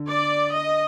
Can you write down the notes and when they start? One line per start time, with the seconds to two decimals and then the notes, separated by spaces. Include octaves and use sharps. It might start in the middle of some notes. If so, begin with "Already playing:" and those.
Already playing: D3
0.09 D5
0.55 D#5